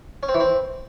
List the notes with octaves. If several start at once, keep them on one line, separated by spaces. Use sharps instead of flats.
C#4
C4
E3
C4